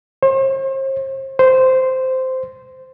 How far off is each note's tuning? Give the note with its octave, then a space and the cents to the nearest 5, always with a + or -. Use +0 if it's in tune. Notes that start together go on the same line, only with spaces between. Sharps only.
C5 +40
C5 -10